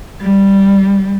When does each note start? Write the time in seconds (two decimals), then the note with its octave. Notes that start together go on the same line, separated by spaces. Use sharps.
0.20 G3